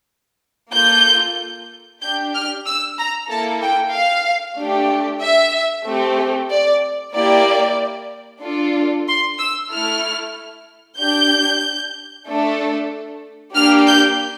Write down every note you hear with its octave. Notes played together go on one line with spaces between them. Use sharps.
A#3 F4 A4 G6
D4 G4 G6
F6
E6
A#5
A#3 E4 A4 A5
G5
F5
A3 D4 G4
E5
A3 C4 G4
D5
A#3 E4 G4 D5
D4 F4 A4
C6
E6
A3 E4 A4 F6
D4 G4 G6
A3 D4 A4
A#3 D4 G4 F6
G6